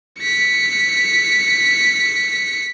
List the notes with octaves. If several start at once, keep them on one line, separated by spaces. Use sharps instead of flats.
B6 C#7